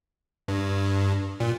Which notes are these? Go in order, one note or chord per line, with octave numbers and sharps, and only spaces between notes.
G2
A#2